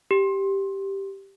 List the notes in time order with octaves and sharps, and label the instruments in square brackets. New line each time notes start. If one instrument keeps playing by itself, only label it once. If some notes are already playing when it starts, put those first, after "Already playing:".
[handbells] G4